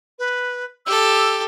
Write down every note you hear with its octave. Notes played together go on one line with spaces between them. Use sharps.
B4
G4 A4 E6